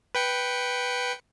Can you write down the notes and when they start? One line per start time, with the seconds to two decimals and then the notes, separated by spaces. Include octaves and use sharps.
0.15 B4 G5 C#7